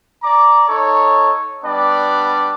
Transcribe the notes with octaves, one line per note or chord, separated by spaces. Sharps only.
D5 A#5 D6
D#4 A4 C#5
G3 B3 D4 D5